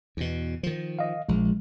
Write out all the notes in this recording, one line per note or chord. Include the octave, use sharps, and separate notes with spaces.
E2 B2
D#3 F3
D#5 F5
A#1 F3 G#3